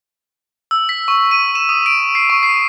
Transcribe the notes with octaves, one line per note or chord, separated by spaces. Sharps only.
E6
B6
C#6
D#7
E7
D#6
D7
C7
C#6
C7